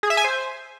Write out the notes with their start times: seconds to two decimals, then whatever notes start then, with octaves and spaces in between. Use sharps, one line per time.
0.03 G#4
0.10 E5
0.17 G#5
0.24 C5